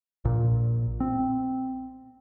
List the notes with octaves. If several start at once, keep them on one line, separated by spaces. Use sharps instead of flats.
A#1 A#2
C4